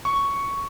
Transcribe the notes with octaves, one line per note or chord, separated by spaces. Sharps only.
C#6